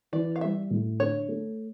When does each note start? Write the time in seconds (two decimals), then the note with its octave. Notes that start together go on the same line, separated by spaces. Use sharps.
0.12 E3 D5
0.36 F5
0.41 G3 E5
0.71 A2
0.99 D3 C#5
1.28 A3